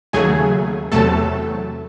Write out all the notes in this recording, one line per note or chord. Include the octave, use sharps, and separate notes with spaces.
D#2 C#3 F#3 A3 G#4 G#5
E2 C3 F#3 A3 A4 A5